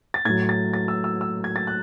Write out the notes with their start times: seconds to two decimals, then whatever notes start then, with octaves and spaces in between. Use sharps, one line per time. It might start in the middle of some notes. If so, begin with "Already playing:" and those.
0.14 A6
0.25 A2 G#6
0.30 F#3
0.49 A6
0.74 A6
0.88 E6
1.04 E6
1.21 E6
1.44 G#6
1.56 A6
1.67 F#6